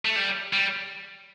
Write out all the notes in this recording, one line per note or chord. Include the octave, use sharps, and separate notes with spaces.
A3
G3
G3